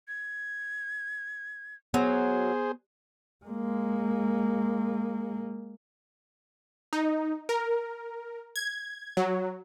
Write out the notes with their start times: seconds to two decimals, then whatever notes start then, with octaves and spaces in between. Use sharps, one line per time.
0.08 G#6
1.94 F#3 B3 G#4 C5
3.45 G#3 A#3
6.93 D#4
7.49 A#4
8.56 G#6
9.17 F#3